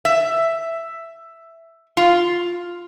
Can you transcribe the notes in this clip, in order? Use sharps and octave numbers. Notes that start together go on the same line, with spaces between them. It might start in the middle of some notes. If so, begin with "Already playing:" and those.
E5
F4